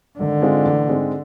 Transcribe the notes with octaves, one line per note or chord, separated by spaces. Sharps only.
G#1 D3
G#2 G#3 C4 F4
A1
G#2 G#3 C4